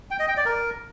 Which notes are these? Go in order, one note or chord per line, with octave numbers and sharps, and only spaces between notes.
G5
D#5
G5
D5
A#4